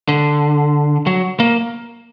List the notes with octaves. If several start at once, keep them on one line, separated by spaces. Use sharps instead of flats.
D3
F#3
A#3